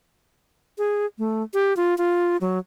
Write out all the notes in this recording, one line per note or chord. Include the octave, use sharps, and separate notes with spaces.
G#4
A3
G4
F4
F4
F#3